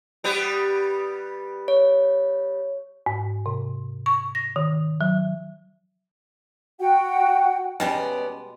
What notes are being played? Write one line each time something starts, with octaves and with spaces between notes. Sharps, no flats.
G3 B3 G4
C#5
G#2
C3
C#6
A#6
D#3
F#3
F#4 F#5 G5
B2 G3 G#3 B3 C#4 D5